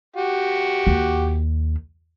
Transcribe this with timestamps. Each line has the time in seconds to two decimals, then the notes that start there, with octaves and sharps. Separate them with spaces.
0.16 F#4 G4
0.87 D#2